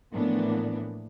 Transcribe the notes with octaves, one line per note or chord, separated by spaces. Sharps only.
A2 E3 F3 A#3 B3 D4